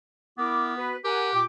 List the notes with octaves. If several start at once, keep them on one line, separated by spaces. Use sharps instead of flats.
B3 E4 A#4 D6
F#4 B4
G4 A#4 F#5 G#5
A#2 G5 D6